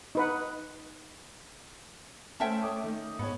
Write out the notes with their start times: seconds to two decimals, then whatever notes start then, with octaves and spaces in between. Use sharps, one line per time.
0.15 D#4 B4 F#5
2.40 A3 C#4 C5 E5 G5 A5
2.62 C#5 D6 D#6
2.84 D#3
3.19 G#2 B3 C#5